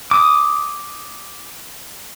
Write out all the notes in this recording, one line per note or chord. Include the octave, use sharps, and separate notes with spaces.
D6 D#6